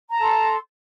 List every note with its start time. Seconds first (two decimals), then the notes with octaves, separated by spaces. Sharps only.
0.09 A#5
0.14 A5
0.18 A4
0.22 C6